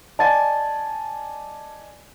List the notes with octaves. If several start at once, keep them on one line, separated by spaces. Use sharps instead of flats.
D5 D#5 G#5 A5 A6